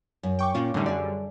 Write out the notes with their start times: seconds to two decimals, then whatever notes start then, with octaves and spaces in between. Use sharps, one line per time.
0.23 F#2
0.39 G5 C#6 D6
0.54 A#2 C#4 F4
0.74 F#2 A2 D3 G3 D#4
0.86 G#4 D5